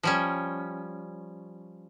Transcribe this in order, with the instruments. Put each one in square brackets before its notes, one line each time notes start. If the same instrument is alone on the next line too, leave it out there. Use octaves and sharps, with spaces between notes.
[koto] F3 G3 C#4